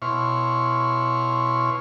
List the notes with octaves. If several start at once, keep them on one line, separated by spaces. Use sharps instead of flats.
B2 E4 C#5 C6 C#6 F6